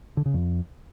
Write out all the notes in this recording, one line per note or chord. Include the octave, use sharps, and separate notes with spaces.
D3
C#3
F2